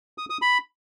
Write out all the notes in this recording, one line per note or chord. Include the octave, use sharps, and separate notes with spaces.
D#6
D#6
B5